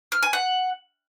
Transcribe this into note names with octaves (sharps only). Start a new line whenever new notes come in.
F6
G#5
F#5